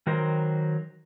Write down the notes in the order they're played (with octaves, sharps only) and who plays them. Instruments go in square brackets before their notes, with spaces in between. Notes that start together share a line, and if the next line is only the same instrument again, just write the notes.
[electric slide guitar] D#3 F#3 A#4 C5